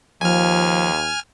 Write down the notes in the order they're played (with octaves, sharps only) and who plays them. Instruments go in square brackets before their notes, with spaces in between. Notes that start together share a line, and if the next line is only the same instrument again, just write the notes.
[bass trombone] D#2 [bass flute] F3 [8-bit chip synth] G#5 F6